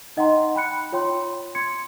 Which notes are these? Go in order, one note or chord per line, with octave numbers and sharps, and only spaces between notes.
D#4 D#5 F#5 G5 A#5 C6
G5 B5 F#6 C#7
F4 C#5 G5 C6
C6 G#6 C#7